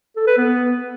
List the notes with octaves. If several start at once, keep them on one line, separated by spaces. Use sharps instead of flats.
A4
B4
B3